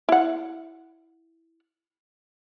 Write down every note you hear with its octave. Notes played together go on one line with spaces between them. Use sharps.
E4 F#5